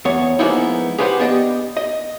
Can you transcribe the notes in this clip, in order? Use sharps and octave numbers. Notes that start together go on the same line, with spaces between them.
E2 B3 C#5
F3 G#3 A#3 B3 D#4 E4
G4 G#4 B4 C5 F5 F#5
B3 D4 G4 D#5
D#5